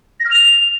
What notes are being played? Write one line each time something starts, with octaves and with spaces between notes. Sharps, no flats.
A#6
F6
F7